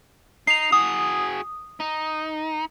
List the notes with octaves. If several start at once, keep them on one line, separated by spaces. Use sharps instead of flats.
D#4 C7 F7
F#4 G#4 D#6
D#4